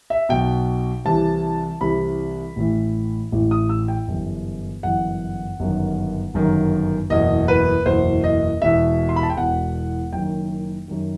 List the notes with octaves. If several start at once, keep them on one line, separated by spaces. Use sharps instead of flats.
E5
B1 B2 G5
C2 C3 E3 A5
C2 C3 E3 B5
A1 A2 E3
A1 A2 E3
D#6
E6
G5
G1 F#2 E3
G1 F#2 E3 F#5
G1 F#2 D#3
G1 F#2 D#3
F#1 E2 B2 D#5
B4
F#1 E2 B2 C5
D#5
E1 E2 B2 E5
C6
B5
A5
G5
E1 E2 B2 F#5
F#1 F#2 D#3 G5
F#2 D#3